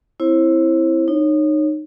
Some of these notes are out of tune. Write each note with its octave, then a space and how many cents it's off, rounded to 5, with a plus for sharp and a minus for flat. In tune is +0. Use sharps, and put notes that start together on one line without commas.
C4 +0 E4 +0 C5 +35
D#4 -25 C#5 -10